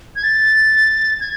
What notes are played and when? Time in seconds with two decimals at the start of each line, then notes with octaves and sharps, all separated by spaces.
0.16 G#6
0.23 A6
1.21 G#6